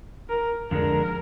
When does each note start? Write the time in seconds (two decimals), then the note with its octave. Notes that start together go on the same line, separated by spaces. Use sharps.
0.29 A#4
0.71 F2 D3 G#3 D4 A#4